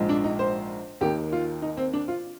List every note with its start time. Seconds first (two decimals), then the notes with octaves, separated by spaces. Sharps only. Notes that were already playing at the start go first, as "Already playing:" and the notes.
Already playing: A#1 G#2 F3 G#3
0.09 D4
0.24 D#4
0.39 C5
1.01 D#2 D#3 A#3 G4
1.32 F4
1.62 D#4
1.77 C4
1.93 D4
2.08 F4